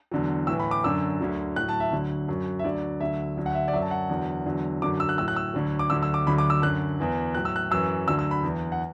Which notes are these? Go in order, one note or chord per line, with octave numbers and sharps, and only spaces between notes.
E2 D3 F#3
A2 E3 E6
B5
D6
F#2 D3 F#3 E6
D2 D3 F#3
A2 F#3 F#6
A5
E5
D2 D3 F#3
F#2 F#3
E5
D2 D3 F#3 D5
D2 D3 F#3 E5
D2 D3 F#3
F#5
E5
D5
F#2 F#3 E5
A5
F#5
E2 D3 F#3
E2 D3 F#3
F#2 D3 F#3 D6
E6
F#6
A2 F#3 E6
F#6
E6
D2 D3 F#3
D6
D2 D3 F#3 E6
E6
D6
D2 D3 F#3 B5
D6
E6
F#2 D3 F#3 F#6
E2 E3
A2 F#3 F#6
E6
F#6
F#2 E3 E6
D2 D3 F#3 E6
E6
B5
E2 E3
F#5